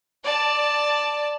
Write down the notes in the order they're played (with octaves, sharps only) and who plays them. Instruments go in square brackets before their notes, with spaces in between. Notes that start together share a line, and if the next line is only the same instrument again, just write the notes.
[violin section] D5 A5